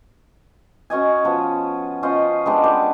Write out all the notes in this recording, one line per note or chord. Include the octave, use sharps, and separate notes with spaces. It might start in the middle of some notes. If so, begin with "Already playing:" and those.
C#4 F#4 D#5 G#5
F3 B3
C#4 F4 C5 D#5
G#3 B3 D4 G4
G4 B4 D5